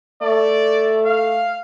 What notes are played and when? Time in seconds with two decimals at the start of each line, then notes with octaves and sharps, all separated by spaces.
0.22 A3 D5
1.06 F5